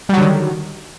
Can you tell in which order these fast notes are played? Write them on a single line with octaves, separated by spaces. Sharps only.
G3 F#3 D3 D#3